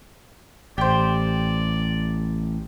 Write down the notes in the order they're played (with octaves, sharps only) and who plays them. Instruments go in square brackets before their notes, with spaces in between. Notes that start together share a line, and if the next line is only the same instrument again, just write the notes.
[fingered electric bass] A1 [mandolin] G4 C5 [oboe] D5